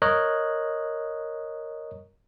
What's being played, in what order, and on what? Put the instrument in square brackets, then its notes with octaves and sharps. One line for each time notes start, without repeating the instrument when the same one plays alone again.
[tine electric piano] A#4 C#5 D#5 F#6